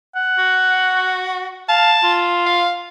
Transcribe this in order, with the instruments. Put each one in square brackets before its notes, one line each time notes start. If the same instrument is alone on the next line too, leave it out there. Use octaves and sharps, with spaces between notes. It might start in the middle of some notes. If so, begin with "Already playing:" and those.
[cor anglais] F#5
[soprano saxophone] F#4
[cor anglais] F5 [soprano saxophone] A5
[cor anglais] F4
[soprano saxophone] F5